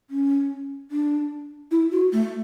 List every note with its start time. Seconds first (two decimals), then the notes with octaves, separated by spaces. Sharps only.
0.10 C#4
0.91 D4
1.71 E4
1.92 F#4
2.13 A3